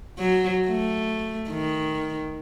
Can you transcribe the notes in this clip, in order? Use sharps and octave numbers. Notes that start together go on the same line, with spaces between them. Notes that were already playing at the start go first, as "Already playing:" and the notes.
F#3
A3
D#3